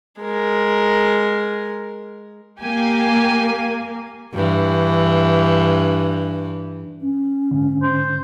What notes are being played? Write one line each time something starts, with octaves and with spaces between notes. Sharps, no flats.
G#3 A#4
A#3 G4 G#5
G2 E3
C#4
G#2 D3
C5